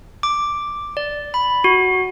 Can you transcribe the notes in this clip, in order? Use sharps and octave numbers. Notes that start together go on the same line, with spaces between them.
D6
D5
B5
F#4